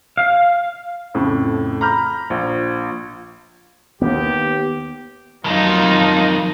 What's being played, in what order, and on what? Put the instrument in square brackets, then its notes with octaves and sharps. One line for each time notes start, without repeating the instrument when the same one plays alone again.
[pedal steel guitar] F5
[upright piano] F2 A2 C#3
A#5 B5 F6 G6
A#1
[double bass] D#2 [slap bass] B3 [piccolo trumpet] G4
[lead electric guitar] F2 D#3 [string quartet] F#3 D#4 F4